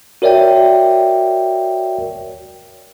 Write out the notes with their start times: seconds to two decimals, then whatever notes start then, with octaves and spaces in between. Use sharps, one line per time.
0.22 F#4 A#4 C#5 D5 E5 G5